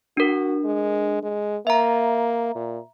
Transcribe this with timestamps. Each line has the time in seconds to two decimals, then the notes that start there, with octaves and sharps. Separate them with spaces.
0.17 D4 F#4 A#4
0.65 G#3
1.23 G#3
1.67 A#3 E5 A#5
2.55 A#2